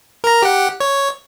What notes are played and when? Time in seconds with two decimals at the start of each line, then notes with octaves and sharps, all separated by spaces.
0.24 A#4 A#5
0.42 G4 F#5
0.80 C#5